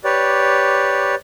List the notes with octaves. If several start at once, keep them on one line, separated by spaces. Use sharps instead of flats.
G4 B4 C#5 D5